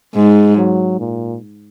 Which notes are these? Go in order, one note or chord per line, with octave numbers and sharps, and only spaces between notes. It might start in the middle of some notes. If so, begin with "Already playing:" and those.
G#2 G#3
F#3
A#2